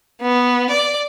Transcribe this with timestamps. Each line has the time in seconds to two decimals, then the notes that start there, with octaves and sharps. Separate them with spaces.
0.22 B3
0.70 D5